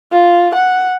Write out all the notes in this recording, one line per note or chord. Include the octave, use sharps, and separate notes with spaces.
F4
F#5